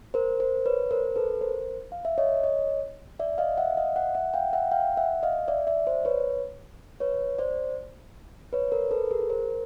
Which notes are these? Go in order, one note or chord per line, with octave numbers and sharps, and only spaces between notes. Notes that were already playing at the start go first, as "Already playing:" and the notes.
A#4 C5
A#4 C5
B4 C#5
A#4 C5
A4 B4
A#4 C5
F5
E5
C#5 D#5
C#5 D#5
D5 E5
D#5 F5
E5 F#5
D#5 F5
E5 F#5
E5 F#5
F5 G5
E5 F#5
F5 G5
E5 F#5
D#5 F5
D5 E5
D5 E5
C5 D5
B4 C#5
B4 C#5
C5 D5
B4 C#5
A#4 C5
A4 B4
G#4 A#4
A#4 C5